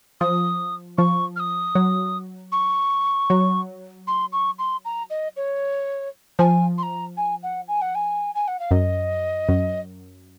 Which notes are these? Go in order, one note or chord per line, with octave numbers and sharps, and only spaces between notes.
F3 D#6
F3 C#6
F6
D#6
F#3
C#6
F#3
C6
C#6
C6
A#5
D#5
C#5
F3 G#5
C6
A#5
G#5
F#5
G#5
F#5
G#5
G#5
F#5
F5
F#2 D#5
F#2